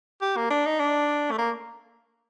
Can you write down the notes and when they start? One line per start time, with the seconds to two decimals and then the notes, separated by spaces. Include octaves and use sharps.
0.21 G4
0.36 A#3
0.50 D4
0.66 D#4
0.79 D4
1.31 A3
1.38 A#3